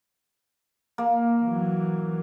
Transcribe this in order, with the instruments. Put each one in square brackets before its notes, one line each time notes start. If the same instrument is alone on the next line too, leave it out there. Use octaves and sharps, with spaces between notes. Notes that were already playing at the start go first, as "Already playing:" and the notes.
[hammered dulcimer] A#3
[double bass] E3 F#3